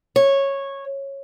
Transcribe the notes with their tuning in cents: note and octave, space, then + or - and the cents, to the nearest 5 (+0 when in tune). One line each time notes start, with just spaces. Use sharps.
C#5 -10